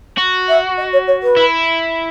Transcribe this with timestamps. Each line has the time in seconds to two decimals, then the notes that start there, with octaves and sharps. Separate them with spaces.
0.18 F#4
0.48 E5
0.77 D#5
0.93 C#5
1.07 C#5
1.22 B4
1.37 E4